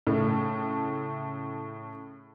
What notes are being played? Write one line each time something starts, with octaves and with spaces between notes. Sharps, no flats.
A2 C#3 A3